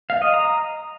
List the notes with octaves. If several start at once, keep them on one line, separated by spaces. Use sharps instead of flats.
F5
D#5
A#5